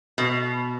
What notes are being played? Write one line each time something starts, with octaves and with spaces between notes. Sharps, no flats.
B2